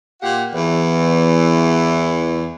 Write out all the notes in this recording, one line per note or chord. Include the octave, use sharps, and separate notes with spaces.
A#2 G4 F5 F#5
E2 E3